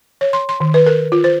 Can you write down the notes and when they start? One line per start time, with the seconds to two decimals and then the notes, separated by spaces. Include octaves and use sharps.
0.21 C#5
0.33 C6
0.49 C6
0.60 D#3
0.74 B4
0.86 A#4
1.12 F4
1.24 C5